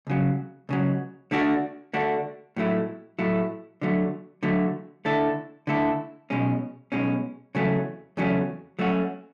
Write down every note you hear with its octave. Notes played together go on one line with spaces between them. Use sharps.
C#2 C#3 F#3
C#2 C#3 F#3
D3 A3 D4 F#4
D3 A3 D4 F#4
A2 F#3 A3 E4
A2 F#3 A3 E4
D3 F#3 A3
D3 F#3 A3
D3 A3 E4 A4
D3 A3 E4 A4
B1 B2 G#3 C#4
B1 B2 G#3 C#4
E2 C#3 F#3 A3 C#4
E2 C#3 F#3 A3 C#4
F#3 A3 C#4 F#4